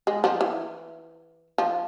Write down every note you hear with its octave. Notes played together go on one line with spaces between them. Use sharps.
G#3
F3
E3
F3